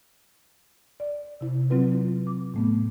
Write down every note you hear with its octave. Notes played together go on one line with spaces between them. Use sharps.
D5
C3 E4
F#3 C4 F4 B4
D6
A2 A3 B3